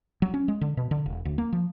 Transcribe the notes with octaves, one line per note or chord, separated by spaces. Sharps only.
F#3
C#4
G#3
D3
B2
D3
E1
D2
A#3
F3